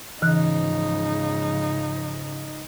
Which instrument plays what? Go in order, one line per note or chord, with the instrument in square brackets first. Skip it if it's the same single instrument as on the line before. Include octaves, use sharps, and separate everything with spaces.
[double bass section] G#2 C#3 F3 [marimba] E3 F#6 [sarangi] D#4